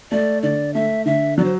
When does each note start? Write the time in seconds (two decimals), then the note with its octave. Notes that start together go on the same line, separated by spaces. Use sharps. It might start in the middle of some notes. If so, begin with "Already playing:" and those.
0.11 A3 D5
0.42 D3 D5
0.74 A3 E5
1.05 D3 E5
1.38 F#3 D5
1.45 C5